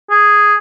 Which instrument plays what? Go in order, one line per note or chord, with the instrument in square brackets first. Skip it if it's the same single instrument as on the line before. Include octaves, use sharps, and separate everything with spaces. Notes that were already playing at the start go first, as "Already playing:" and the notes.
[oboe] G#4